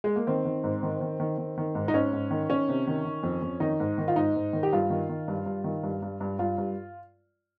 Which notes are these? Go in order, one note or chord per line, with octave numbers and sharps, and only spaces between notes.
G#3
A#3
D#3 C4
D#3
G#2
D#3
D#3
D#3
D#3
D#3
G#2
D#4
G#2 C#4
G#2
D#3
D#3 C#4
C3
D#3
D#3
F2
F2
D#3 D#4
G#2
D#3
F4
G#2 D#4
G#2
D#3
G4
G2 F4
D#3
D#3
G2
G2
D#3
G2
G2
G2
G2 F4
G2